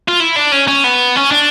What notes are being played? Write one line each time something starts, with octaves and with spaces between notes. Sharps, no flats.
F4
E4
D4
C#4
C#4
B3
C#4
D4